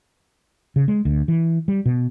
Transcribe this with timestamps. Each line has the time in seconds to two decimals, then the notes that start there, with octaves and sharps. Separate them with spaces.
0.76 C#3
0.88 G#3
1.05 D2
1.28 E3
1.68 G3
1.86 B2